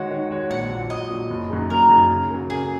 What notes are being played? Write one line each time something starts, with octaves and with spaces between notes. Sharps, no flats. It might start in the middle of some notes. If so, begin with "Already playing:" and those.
Already playing: D#3 G#3 F#4 C#5 F#5
D#3
G#3 F#4 C#5
A#1 F#5
A#2 F#3
A#1 D#5
A#2 F#3
F#1
F#2 F#3 D#4 G#4
F#1 A#4
F#2 F#3 D#4 G#4
C#3
F#3 A#3
C#3 G#4